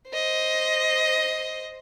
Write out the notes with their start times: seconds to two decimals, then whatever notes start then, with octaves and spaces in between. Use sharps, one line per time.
0.10 C5 D#5